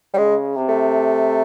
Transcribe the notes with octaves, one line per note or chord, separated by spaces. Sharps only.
G3
C#3 G#3
C3
A3